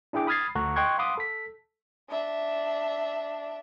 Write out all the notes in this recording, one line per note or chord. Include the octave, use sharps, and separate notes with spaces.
D4 E4 G#4 G5 D6
B5 D#6 F6 G#6 A6 C7
D2 A4 F#5 A#5 C#6
D#5 G5 C6 C#6 F#6 G#6
F5 F#5 B5 C6 D6 D#6
A4 B6
D4 E5